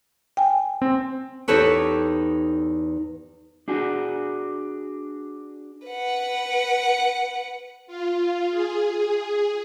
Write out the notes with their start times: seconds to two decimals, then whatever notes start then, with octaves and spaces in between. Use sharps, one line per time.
0.37 G5 G#5
0.82 C4
1.48 E2 D#4 G4 A4 B4 C#5
3.68 D4 F#4 G#4
5.87 B4 F#5
7.87 F4
8.50 G#4